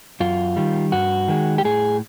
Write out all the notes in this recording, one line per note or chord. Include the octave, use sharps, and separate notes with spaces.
F#2 F4
D#3 G3
G2 F#4
D#3 G#3
G4
A2 G#4